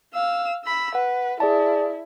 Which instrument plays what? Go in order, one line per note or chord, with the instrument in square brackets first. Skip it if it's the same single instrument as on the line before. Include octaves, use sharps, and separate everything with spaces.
[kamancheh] F5 E6
B5 E6
[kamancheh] B4 [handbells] F#5
[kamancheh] E4 [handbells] G#4 D5 A5